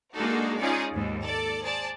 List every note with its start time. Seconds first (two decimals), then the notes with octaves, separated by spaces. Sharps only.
0.16 G#3 A#3 D4 D#4 F#4 A4
0.59 C#4 D#4 F4 G#4 D5
0.93 D#2 G#2
1.23 A4 D5
1.61 G#4 C5 D5 A5